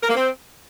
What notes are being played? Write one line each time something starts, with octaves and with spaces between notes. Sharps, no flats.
A#4
A#3
C4